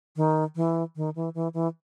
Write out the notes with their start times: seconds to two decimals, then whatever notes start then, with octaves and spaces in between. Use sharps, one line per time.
0.16 D#3
0.56 E3
0.96 D#3
1.15 E3
1.34 E3
1.54 E3